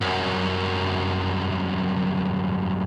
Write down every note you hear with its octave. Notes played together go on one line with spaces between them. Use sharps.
C2 F#2